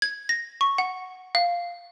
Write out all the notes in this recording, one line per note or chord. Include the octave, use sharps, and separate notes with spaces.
G#6
A#6
C#6
F#5
F5